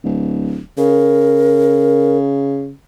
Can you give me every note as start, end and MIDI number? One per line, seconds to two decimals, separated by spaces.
0.04 0.60 26
0.78 2.71 49
0.78 2.18 70